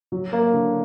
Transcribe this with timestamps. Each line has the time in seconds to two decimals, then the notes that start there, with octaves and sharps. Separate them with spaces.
0.12 F#3
0.33 A#3
0.53 D3